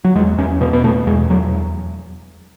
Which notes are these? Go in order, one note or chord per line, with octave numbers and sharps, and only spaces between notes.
F#3
E2 G#3
E2 C#4
B2 B3
B3
B2 A3
E2 G#3
E2 F#3